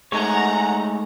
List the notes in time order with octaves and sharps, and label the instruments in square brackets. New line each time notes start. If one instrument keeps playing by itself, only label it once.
[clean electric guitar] G#3 A3 D#4 [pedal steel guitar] C#5 G#5 [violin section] F#5 A#5